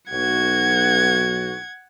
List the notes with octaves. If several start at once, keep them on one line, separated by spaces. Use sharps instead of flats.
B1 F#4 F#5 G#6